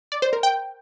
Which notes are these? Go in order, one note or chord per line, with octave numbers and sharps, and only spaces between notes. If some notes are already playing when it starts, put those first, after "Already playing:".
D5
C5
A#4
G5